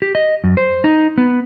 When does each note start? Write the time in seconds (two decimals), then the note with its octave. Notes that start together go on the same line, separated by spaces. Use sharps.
0.02 G4
0.15 D#5
0.44 F#2
0.57 C5
0.84 D#4
1.18 B3